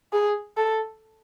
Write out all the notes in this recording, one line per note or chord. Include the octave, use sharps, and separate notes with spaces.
G#4
A4